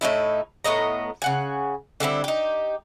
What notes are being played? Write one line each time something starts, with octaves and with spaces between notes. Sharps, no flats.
A2 C3 D#4 E4
A2 B3 D#5 A#5
C#3 F#5 G#5
D3 G3 C4 E4
D#4 G4